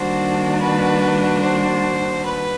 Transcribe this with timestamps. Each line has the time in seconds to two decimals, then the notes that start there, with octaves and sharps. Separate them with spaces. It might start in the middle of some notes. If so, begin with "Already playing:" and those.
Already playing: D#3 G3 A#3 D4 F#4 C5
0.60 B4
1.43 C5
2.25 B4